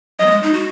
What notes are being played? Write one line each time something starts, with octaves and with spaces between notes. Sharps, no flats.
F#3 D#5
B3
G#3
D#4
F#4